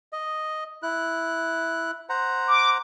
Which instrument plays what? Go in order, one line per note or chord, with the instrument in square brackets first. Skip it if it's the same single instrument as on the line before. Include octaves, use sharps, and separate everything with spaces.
[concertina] D#5
E4 F#6
C5 F#5 A#5
[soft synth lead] D6